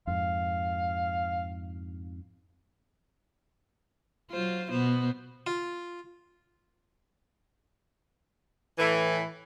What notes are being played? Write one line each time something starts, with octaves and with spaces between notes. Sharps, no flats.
F2 G#2 F5
F#3 F4 C5
B2 B3 C5
F4
A2 E3